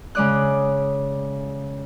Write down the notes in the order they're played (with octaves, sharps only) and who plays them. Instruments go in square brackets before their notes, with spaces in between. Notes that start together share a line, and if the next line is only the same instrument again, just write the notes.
[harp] C#3 G#3 D5 D#6 F#6